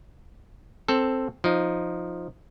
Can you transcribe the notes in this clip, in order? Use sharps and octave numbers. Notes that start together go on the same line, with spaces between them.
C4 A4
F3 D#4